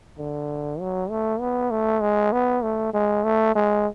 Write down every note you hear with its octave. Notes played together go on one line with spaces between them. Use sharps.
D3
F#3
A3
B3
A3
G#3
B3
A3
G#3
A3
G#3